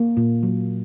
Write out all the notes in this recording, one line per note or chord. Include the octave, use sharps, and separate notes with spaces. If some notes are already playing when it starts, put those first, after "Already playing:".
Already playing: A#3
A#2
F#3